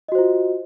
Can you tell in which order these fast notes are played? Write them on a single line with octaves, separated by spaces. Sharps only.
D#5 F#4 C5 F4